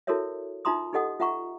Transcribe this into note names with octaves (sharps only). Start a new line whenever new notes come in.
E4 F#4 A4 A#4 C#5 E5
D#4 F4 E5 A#5 C6 D#6
D#4 G4 A4 D#5 F#5 D#6
F4 E5 F#5 A#5 C#6